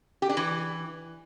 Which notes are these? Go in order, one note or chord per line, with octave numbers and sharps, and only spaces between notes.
G4
D4
E3